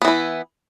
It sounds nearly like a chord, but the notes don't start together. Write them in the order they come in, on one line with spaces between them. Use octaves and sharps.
B3 E3 E4